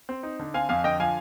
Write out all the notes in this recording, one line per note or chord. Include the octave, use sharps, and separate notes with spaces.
C4
D#4
D3
C4 F5 G#5
F2 F5 G#5
D3 D#5 G5
F3 F5 G#5